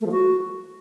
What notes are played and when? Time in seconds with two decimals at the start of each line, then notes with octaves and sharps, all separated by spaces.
0.01 A3
0.06 F3
0.11 F#4